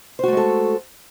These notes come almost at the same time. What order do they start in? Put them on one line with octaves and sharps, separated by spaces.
C5 F#4 A3 G#3 A4